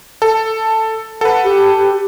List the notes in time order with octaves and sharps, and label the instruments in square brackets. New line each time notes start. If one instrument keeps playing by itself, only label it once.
[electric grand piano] A4
[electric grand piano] A4 B4 [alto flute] F#5
[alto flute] G4